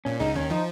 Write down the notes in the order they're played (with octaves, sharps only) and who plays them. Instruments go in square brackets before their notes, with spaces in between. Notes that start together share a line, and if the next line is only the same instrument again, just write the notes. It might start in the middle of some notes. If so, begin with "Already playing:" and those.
[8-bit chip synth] A#2 [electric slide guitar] C#4
[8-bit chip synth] C#2 C#3 [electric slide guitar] D#4
[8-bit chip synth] D#2 D#3 [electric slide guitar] C#4
[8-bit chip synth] F3 [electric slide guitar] D#4